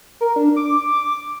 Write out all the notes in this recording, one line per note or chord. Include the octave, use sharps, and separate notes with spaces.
A#4
D4
D6